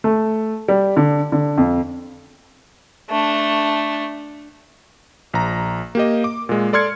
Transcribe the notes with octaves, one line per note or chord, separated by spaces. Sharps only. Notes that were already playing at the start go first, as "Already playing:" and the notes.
A3
G3
D3
D3
F2
A3 D4
A#1 A#5
A#3 G4 D#5
D6
A#2 G#3
A4 D5 C6 F6 G#6 C#7